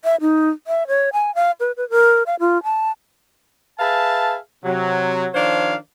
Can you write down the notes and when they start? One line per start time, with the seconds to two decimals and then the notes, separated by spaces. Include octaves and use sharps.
0.04 E5
0.21 D#4
0.67 E5
0.88 C#5
1.13 G#5
1.35 F5
1.60 B4
1.77 B4
1.90 A#4
2.26 F5
2.40 F4
2.64 A5
3.79 G#4 B4 E5 F5 A5
4.64 C3 F#3
5.34 D#3 F3 D4 C5 C#5 F5